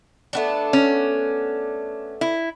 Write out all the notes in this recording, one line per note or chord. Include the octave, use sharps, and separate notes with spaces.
A3 B3 D4
C#4
E4